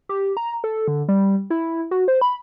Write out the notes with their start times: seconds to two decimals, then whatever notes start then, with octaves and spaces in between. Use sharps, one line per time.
0.09 G4
0.37 A#5
0.64 A4
0.88 D3
1.09 G3
1.50 E4
1.91 F#4
2.08 C5
2.21 B5